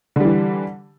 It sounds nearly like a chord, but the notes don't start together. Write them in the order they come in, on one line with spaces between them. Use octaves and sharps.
D3 G3 E3